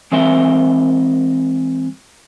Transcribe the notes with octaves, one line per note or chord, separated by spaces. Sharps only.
E3 G#3 C4 A#4 E5 C6